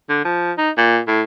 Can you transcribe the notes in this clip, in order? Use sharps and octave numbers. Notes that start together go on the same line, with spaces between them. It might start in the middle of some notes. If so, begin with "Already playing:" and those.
D3
F3
D#4
A#2
A2